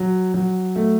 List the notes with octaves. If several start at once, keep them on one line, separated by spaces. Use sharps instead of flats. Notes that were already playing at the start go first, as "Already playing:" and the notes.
Already playing: F#3
F#3
A3